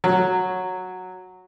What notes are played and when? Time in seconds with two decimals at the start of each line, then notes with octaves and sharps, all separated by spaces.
0.04 F#3